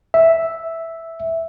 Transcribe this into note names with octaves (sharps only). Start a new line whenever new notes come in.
E5